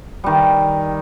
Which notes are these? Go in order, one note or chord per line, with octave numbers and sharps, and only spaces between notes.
D#3 G3